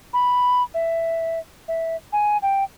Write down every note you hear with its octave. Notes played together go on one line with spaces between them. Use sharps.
B5
E5
E5
G#5
G5